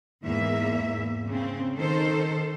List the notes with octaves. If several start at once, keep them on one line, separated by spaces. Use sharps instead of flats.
E2 G#2 A#3 E5
C#3 C4
D#3 A4 C5